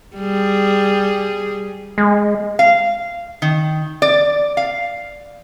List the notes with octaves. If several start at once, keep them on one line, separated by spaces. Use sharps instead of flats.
G3 G#4
G#3
F5
D#3
D5
F5